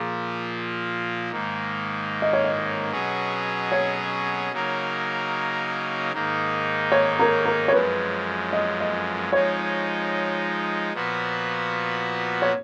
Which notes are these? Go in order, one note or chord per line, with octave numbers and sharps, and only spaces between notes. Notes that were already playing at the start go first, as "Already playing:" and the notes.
Already playing: A#2 F3 A#3 G#4
G#2 D#3 A#3
D#5
C#5
D#5
B2 F#3 C#4 G#4
C#5
C#3 F#3 A#3 D#4 A#4
G#2 D#3 A#3 D#4
C#5
A#4
A#4
C#5
F#2 F3 G#3 B4
D#5
D#5
F3 G#3 D#4 C#5
A#2 F3 B3 F#4
C#5